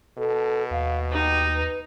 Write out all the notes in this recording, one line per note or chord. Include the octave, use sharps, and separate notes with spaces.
B2 A4
D#2 F5
D#4 G4
B4